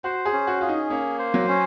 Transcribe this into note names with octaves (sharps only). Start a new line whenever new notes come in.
F#4 C5
G#4
C#4
F#4
F4 G#4
D#4
A#3 C#4
C5
F#3
C#4